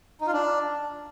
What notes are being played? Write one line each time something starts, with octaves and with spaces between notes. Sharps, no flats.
D#4
F4
D4